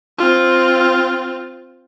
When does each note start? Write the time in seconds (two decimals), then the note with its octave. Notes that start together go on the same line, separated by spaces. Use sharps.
0.19 C4 F4